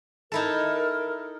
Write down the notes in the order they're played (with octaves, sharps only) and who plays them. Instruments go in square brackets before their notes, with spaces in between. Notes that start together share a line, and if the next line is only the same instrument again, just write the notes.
[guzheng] D#4 E4 A4 [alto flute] A#4